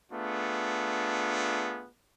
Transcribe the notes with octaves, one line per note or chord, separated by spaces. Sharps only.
A3 B3 D4 F4 G#4